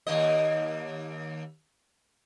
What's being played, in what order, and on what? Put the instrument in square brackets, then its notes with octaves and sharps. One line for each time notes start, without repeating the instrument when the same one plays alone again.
[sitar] D#2 A#3 D#5